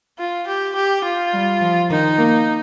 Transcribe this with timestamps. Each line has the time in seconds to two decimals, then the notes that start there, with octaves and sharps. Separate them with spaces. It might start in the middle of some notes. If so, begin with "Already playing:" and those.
0.19 F4
0.48 G4
0.76 G4
1.04 F4
1.33 G3
1.61 F3
1.90 D#3 D#4
2.18 A#3